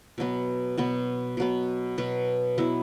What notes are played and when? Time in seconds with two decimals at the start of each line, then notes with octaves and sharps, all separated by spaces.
0.18 B2 F#3 B3
0.78 B2 F#3 B3
1.37 B2 F#3 B3
1.98 B2 F#3 B3
2.58 F#3 B3 E4